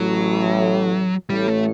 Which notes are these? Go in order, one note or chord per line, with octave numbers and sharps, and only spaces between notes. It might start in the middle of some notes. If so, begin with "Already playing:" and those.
Already playing: A1 A2 F#3
A1 A2 G3
A3